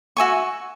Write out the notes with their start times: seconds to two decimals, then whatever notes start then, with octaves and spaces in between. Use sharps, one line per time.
0.17 F#4 E5 G#5 C#6